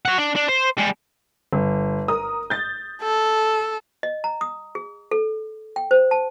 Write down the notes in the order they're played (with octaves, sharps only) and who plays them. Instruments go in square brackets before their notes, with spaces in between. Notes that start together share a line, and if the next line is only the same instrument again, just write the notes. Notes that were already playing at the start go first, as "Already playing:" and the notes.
[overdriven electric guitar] C#5 F#5
D4
D4
C5
G3 G#3
[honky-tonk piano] G1
A#4 D#6
G6 A6
[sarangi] A4
[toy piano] D#5
A#5
D#6
G#4
A4
G5
C5
A5